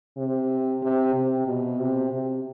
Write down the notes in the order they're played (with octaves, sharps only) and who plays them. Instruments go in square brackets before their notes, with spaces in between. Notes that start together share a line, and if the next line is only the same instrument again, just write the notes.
[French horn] C3
C3
C3
B2
C3
C3